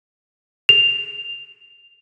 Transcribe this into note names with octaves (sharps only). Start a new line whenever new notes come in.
F7